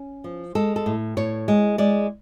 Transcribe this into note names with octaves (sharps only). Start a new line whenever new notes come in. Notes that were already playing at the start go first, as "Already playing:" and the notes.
Already playing: C#4
F3
G#3 A4
A4
A2
A2 C#5
G#3
G#3 D5